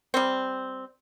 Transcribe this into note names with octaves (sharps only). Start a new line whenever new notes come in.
G3 C4